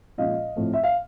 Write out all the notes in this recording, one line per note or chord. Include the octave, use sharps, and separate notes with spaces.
A#2 F3 G#3 C#4 D#5 F5
A2 F3 A3 C4
E5
F5